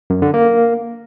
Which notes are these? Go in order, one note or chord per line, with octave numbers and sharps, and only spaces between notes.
F#2
D3
A#3